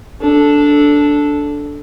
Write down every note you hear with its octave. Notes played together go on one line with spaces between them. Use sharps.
D4 A4